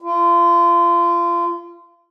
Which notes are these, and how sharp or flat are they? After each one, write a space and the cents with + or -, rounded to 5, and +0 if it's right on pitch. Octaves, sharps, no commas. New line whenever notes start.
F4 -30